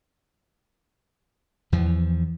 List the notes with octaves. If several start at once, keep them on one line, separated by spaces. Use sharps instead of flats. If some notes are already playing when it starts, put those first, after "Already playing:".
E2 E3 F3